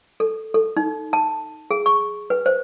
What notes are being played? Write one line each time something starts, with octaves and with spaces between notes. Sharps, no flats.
A4
A4
D#4
A5
G#4
C#6
B4
C5